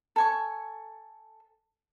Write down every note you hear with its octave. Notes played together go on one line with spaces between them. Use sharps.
A4 G#5 C#6